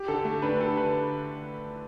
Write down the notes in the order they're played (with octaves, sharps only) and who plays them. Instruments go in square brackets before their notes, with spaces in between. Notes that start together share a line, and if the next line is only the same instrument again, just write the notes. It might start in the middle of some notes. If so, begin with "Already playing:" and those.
Already playing: [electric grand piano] G4
[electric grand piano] D3 [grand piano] A4
[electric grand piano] A3
[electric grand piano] D4 [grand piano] B4
[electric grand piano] G4 [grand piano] A4
[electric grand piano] D3 [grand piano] B4